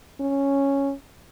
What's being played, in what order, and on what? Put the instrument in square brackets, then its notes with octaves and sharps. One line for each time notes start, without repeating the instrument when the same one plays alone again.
[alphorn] C#4